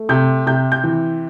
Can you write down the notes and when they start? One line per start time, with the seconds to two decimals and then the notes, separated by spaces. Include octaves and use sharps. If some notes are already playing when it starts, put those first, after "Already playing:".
Already playing: A3
0.09 C3 G6
0.47 C3 G6
0.72 G6
0.84 E3